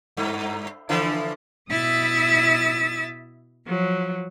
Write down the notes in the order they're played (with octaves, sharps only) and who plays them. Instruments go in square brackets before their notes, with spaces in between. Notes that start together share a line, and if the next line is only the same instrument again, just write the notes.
[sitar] G2
D3 E3 F3
[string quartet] B2 E4 E5 D#6 E6 A6
F3 F#3